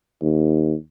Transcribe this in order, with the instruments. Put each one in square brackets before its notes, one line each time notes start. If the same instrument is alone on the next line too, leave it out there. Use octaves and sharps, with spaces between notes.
[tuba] D#2